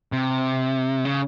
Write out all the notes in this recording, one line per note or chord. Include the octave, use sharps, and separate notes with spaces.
C3
C#3